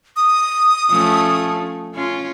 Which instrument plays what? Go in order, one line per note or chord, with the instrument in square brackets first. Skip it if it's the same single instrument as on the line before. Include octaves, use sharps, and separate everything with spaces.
[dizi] D#6
[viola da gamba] F3 A3 C#4
C#4 F4